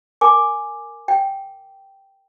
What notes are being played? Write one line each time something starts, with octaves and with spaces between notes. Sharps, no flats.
A#4 G#5 D6
G5